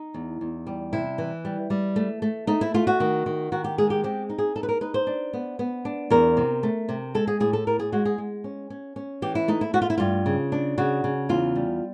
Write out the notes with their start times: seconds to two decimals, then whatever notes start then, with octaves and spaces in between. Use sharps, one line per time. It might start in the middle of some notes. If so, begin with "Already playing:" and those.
Already playing: D#4
0.14 E2
0.41 E2
0.67 G3
0.93 C3 E4
1.18 E3
1.45 G3
1.70 G3
1.96 A3
2.22 A3
2.47 A3 D#4
2.61 E4
2.74 A3 F4
2.87 F#4
3.00 D#3
3.26 D#3
3.52 D#3 F#4
3.64 G4
3.78 G#3 G#4
3.90 G4
4.04 C4 G4
4.29 D#4
4.38 G#4
4.56 D#4 A4
4.63 B4
4.69 A#4
4.81 D#4 B4
4.94 C5
5.07 D4
5.33 B3
5.59 B3
5.85 D4
6.10 E2 A#4
6.37 C3
6.63 A3
6.89 C3
7.14 G#3 A4
7.27 G#4
7.40 A2 G#4
7.53 A4
7.67 A2 A#4
7.79 G#4
7.92 G#3 F#4
8.05 G#4
8.18 G#3
8.44 C#4
8.70 C#4
8.96 C#4
9.22 E3 G4
9.35 E4
9.48 A3 D#4
9.61 E4
9.73 A3 F#4
9.82 F4
9.90 E4
9.98 G2 F4
10.26 C#3
10.52 D4
10.78 C#3 F#4
11.04 C#3
11.29 E2 F4
11.56 G3